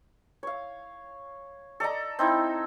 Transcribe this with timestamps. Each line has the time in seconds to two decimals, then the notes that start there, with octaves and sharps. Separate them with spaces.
0.43 C#5 F5
1.80 A4 D5 D#5 A#5
2.19 C4 D#4 E4